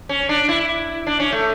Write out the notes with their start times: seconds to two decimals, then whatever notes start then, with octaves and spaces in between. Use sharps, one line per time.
0.09 C#4
0.29 D4
0.49 E4
1.07 D4
1.19 C#4
1.32 A3